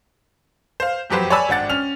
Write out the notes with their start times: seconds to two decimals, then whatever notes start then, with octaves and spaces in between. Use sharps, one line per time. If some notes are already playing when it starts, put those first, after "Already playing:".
0.80 C5 F5
1.10 E1 F2 F#3 G4 B4 C5
1.30 C#5 D5 G#5 A5 B5 E6
1.49 G#1 D4 F#5 A6
1.69 C#4 F6 F7